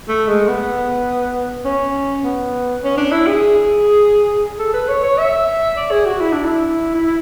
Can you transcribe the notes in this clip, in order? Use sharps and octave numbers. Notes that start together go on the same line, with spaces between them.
A3
G#3
B3
C#4
B3
C#4
D4
E4
G#4
A4
B4
C#5
C#5
E5
D5
G#4
F#4
E4
D4
E4
E4
E4